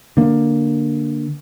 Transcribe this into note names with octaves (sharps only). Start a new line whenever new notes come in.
D3 A#3